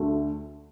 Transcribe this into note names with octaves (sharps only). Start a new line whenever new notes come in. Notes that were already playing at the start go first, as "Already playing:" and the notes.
Already playing: D2 D3 A3